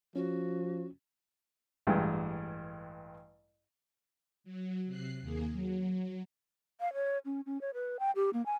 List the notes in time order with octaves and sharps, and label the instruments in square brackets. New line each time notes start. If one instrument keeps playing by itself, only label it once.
[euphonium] F3 [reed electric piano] C#4 [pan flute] F#4
[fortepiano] A1 G2 G#3 G5
[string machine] F#3
C3 F#6 C7
D#2 A#3 G#4
F#3
[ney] F5
C#5
C#4
C#4
C#5
B4
G5
G4
A#3
G#5